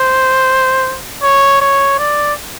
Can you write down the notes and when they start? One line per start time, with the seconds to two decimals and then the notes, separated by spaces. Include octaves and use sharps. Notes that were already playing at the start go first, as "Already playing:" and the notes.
Already playing: C5
1.23 C#5
1.61 C#5
1.99 D5